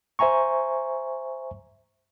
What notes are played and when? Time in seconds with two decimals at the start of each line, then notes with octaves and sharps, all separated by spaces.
0.19 C5 E5 G#5 A#5 C#6